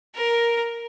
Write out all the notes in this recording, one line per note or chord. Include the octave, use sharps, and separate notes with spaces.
A#4